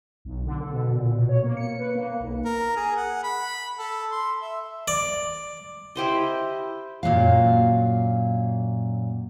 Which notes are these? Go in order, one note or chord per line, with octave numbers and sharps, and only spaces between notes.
B1
D3
A4
B2
A#2
B2
C#5
A#3
C#7
B4
A#3
B1
A#4
G#4
F#5
B5
A4
C6
E5
D5
E4 G4 C5 D#5
F#2 A#2 F#3 F5